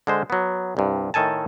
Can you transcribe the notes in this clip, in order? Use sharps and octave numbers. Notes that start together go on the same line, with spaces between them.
D3 G#3 C5
F#3 B3
C2 G2
A2 D#3 A4 G#5 A5